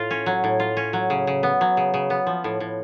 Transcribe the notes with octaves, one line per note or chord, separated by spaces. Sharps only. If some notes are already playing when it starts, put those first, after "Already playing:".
Already playing: A2 F4
C#4
F#3
A2
F4
C#4
F#3
C#3
C#3
B3
F#3
C#3
C#3
B3
F3
A2
A2